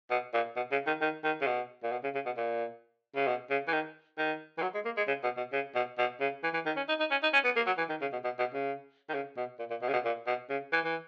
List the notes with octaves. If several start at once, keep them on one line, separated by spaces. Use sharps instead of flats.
B2
A#2
B2
C#3
D#3
D#3
D#3
C#3
B2
A#2
B2
C#3
C#3
B2
A#2
C#3
B2
C#3
E3
D#3
D#3
E3
F#3
G#3
A#3
G#3
C#3
B2
B2
C#3
B2
B2
C#3
E3
E3
D#3
C#4
D#4
D#4
C#4
D#4
C#4
B3
A#3
F#3
E3
D#3
C#3
B2
B2
B2
C#3
D#3
C#3
B2
A#2
A#2
B2
C#3
B2
A#2
B2
C#3
E3
E3